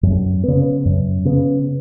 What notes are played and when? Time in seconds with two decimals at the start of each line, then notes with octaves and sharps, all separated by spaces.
0.03 F#2
0.44 C#3 B3
0.85 F#2
1.25 C#3 B3